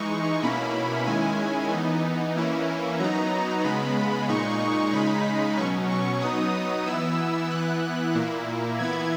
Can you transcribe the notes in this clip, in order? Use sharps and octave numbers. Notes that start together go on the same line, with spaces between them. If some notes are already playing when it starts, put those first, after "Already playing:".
Already playing: E3 G#3 D#4 C#6
B2 A#3 C#4 E4 B5
D#3 G#3 C#4 E4 G#5
E3 B3 D#4
E3 A#3 C#4 E4
F#3 B3 D#4 A#5
C#3 G#3 B3 B5
A#2 G#3 D#4 C#6
C#3 G#3 D#4 B5
B2 F#3 C#4 C#6
C#6
F#3 B3 D#4 D#6
E3 B3 E4 E6
E3 B3 E4 F#6
A#2 A#3 E4
E3 B3 E4 G#6